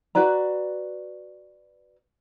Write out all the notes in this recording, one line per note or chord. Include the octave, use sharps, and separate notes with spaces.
F#4 B4 D5 A#5